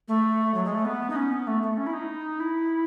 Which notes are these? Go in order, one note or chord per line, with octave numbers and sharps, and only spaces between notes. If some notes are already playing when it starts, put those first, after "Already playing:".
A3
F#3
G#3
A3
B3
D#4
C#4
B3
A3
A3
C#4
E4
D#4
E4